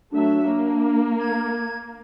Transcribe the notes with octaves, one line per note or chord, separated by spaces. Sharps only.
F#3 A3 D4 E5
A#3
G#6